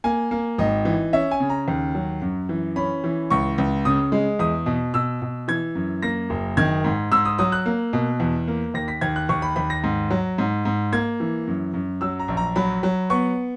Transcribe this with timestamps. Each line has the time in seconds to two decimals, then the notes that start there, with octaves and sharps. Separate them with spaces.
0.04 A#3 G#5
0.31 A#3
0.58 G#1 D#5
0.85 E3
1.13 C#4 E5
1.31 G#5
1.40 C#3
1.50 A#5
1.68 D#2
1.95 F#3
2.22 F#2
2.49 E3
2.76 C#4 B5
3.04 E3
3.30 C#2 C#6
3.58 C#2
3.85 C#3 D#6
4.12 G#3
4.39 E2 D#6
4.66 B2
4.94 B2 E6
5.22 B2
5.48 E3 G#6
5.75 F#2
6.02 A#3 A#6
6.30 F#1
6.57 D#3 G#6
6.84 G#2
7.12 G#2 E6
7.25 D#6
7.38 F#3 D#6
7.52 F#6
7.66 A#3
7.93 B2
8.20 E2
8.48 A#3
8.74 D#2 A#6
8.88 B6
9.01 D#2 G#6
9.16 F#6
9.29 D#2 C#6
9.42 B5
9.56 D#2 B5
9.70 A#6
9.84 G#2
10.10 F#3
10.38 G#2
10.65 G#2
10.92 A#3 G#6
11.20 E3
11.47 F#2
11.74 F#2
12.01 F#3 E6
12.19 A#5
12.28 A#1
12.37 A#5
12.56 F#3 B5
12.83 F#3
13.10 B3 C#6